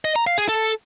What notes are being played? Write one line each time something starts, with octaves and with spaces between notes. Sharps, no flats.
D#5
A#5
F5
G#4
A4